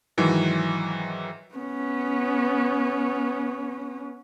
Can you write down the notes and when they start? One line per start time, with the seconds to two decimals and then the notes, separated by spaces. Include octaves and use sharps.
0.18 G#2 D#3 E3 F#3
1.54 B3 C#4